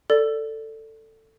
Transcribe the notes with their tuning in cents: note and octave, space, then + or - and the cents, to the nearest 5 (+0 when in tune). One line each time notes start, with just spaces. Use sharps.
A4 +15 D5 -5